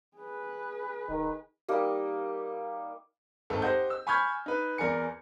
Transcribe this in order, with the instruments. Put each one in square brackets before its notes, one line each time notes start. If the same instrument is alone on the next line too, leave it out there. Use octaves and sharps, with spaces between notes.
[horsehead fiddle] G#4 B4
[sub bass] E1 [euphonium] D#3
[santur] G3 A#3 D#4
[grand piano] G#1 A4
G4 C5 D#5 F#5 G6
E6
G#5 B5 C#6 F6 G6 G#6
D#4 B4
E2 A#4 D5 G#5 C#7